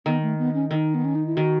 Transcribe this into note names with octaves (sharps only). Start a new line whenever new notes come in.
D#3 B3
A3
B3
C#4
D#3 D#4
B3
C#4
D#4
E4
D#3 F#4